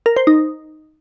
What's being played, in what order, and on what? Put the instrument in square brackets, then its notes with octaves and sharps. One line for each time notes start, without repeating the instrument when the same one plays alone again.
[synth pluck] A#4
C5
D#4